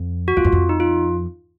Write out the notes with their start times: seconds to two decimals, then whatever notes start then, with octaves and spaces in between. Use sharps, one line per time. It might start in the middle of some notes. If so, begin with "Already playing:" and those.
Already playing: F2
0.28 F#4
0.37 F2 F4
0.44 F#2
0.52 F2
0.69 D#4
0.80 F4